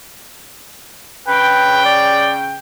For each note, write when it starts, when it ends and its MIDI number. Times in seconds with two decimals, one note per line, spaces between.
1.28 2.58 49
1.28 1.81 71
1.28 2.58 79
1.86 2.32 74